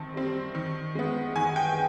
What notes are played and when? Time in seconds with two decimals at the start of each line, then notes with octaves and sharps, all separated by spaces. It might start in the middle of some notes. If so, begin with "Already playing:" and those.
Already playing: D#3 C4 A5
0.14 G3 C4
0.55 D#3
0.95 G#3 B3
1.36 D#3 G#5
1.56 G5